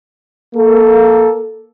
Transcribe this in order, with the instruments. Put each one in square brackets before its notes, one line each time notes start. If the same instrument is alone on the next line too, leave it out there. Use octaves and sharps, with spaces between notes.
[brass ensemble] A#3 A4